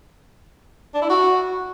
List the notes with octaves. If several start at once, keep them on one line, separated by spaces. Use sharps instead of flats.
D4
E4
F#4